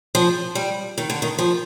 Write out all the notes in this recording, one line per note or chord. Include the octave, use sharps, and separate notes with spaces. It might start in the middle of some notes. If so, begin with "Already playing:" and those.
F3
G3
D#3
D3
D#3
F3